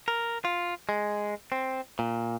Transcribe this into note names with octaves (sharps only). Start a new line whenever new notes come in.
A#4
F4
G#3
C4
A#2